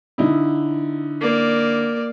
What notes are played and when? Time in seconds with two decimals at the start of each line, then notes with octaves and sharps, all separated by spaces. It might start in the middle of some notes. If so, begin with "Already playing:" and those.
0.18 D3 D#4 E4
1.21 A#3 D5